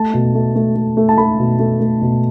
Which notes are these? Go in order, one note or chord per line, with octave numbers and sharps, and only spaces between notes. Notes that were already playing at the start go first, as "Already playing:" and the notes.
Already playing: A3 A5
B2
A3
A3
A3
A3
A5
A3 B5
B2
A3
A3
B2